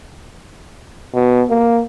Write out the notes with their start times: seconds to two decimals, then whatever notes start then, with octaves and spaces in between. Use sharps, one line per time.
1.14 B2
1.50 A#3